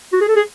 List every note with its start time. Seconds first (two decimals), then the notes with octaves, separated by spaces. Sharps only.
0.13 F#4
0.21 G#4
0.28 A4
0.36 G#4